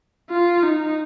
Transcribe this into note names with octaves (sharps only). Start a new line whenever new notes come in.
F4
D#4